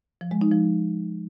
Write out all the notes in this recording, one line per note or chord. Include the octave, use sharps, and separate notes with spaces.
F3
G#3
D#4
F3